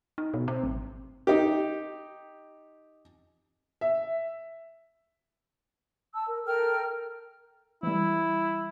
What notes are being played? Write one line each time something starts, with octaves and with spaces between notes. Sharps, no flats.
D#4
B2
C4
G#1
D#4 G4
E5
A5 E6
A#4
A4 A#4 G5 F6
E3 G3 E4